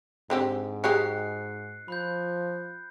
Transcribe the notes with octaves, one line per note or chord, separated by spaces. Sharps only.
G#2 D3 C4 G4
F#3 G#3 G4 F#6 C7 C#7
F3 B5 F#6 G6